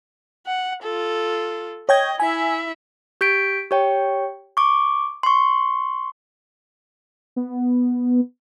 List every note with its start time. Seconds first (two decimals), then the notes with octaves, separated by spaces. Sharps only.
0.46 F#5
0.83 F4 A4
1.89 C#5 D#5 G5 G#6
2.20 E4 E5 G#5
3.21 G4 G6 B6 D7
3.71 G4 C#5 G5
4.57 C#6 D6
5.23 C6 C#6
7.36 B3